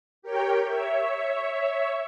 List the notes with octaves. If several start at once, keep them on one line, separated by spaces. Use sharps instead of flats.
G4 A#4 C#5 G5
C#5 E5